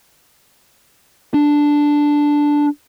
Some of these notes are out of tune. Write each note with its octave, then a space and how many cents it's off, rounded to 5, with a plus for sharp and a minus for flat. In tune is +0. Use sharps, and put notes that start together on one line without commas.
D4 +0